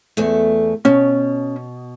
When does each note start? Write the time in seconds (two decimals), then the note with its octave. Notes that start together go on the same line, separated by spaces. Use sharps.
0.17 E2 A3
0.85 B2 C#4